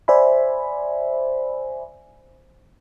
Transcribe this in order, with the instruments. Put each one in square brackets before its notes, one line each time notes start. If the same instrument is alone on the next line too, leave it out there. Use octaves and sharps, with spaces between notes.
[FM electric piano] C5 D5 E5 G#5 B5